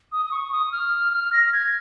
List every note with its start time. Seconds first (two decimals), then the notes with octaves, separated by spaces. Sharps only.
0.12 D#6
0.26 D#6
0.31 C#6
0.52 D#6
0.72 F6
1.12 F6
1.33 A#6
1.45 A#6
1.53 G#6